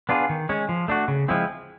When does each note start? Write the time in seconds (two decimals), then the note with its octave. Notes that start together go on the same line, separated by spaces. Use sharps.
0.09 B3 D4 F4 G#4
0.29 D#3
0.49 G#3 C#4
0.69 F3
0.88 A3 D4 F#4
1.08 C#3
1.28 F3 G#3 C4 E4